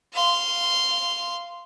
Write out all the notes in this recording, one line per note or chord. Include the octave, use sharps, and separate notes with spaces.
F5 C6